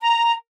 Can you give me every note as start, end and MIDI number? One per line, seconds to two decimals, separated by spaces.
0.01 0.31 82